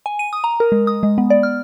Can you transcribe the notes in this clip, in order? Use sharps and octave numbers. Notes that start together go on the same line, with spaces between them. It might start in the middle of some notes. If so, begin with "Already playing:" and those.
G#5
D#7
D#6
A#5
A#4
G#3
D#6
G#3
B3
D5
F6